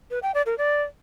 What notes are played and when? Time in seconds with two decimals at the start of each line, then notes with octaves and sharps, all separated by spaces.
0.11 B4
0.23 G5
0.34 D5
0.46 A#4
0.58 D5